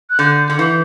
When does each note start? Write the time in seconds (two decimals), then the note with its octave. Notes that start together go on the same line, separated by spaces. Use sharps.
0.10 F#6
0.19 D3 G6
0.50 D3
0.59 E3 G6